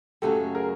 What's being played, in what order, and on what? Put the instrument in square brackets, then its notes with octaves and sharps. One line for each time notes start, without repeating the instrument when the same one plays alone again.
[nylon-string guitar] F#2 C#3 F#3 A3 [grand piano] G4 A4
[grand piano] G#4 A#4